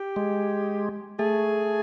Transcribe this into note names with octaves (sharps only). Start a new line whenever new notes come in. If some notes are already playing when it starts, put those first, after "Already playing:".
Already playing: G4
G#3
A3 G#4